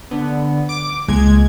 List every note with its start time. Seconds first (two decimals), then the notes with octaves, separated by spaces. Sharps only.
0.11 D3 B3
0.69 D6
1.08 C#2 G#3 A#3 G#6